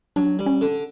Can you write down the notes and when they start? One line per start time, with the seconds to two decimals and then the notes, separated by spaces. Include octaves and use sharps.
0.16 F#3 D4
0.39 G3
0.46 C#4
0.61 D3